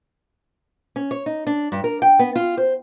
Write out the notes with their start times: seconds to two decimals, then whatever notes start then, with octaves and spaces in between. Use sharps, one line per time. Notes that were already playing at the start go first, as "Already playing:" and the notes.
0.96 C#4
1.11 C#5
1.26 D#4
1.47 D4
1.72 G2
1.84 A#4
2.02 G5
2.19 B3
2.36 F4
2.57 C5